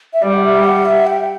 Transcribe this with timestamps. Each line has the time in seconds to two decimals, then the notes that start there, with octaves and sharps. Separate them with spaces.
0.13 E5
0.22 G3 D5
0.33 F#5
0.43 E5
0.64 F#5
0.85 E5
1.07 G5